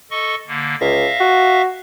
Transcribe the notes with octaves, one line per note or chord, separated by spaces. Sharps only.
A4 D#5 C#6
D3 A#3
C#2 E5 F5 A#6
F#4